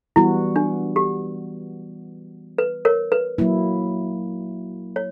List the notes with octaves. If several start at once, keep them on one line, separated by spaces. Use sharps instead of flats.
E3 G3 B3 E4 F#4
D4
G4
B4
A#4 C#5
B4
F#3 A#3 E4
C#5